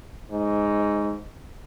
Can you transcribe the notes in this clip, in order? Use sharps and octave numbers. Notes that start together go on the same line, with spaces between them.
G#2